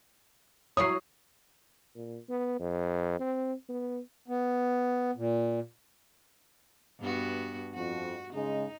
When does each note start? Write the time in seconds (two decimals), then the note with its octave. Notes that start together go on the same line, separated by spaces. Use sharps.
0.77 F#3 E4 C#5 D#6 C7
1.96 A#2
2.29 B3
2.60 F2
3.20 C4
3.69 B3
4.28 B3
5.16 A#2
7.00 G2 B3 F#4
7.75 F2 F#4
8.33 C#3 G#3 D#4